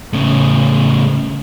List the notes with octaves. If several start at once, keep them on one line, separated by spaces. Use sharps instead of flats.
A2 C#3